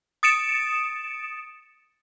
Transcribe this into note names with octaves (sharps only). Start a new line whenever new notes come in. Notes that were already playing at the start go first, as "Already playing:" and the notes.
D#6 A6 C#7 D7 E7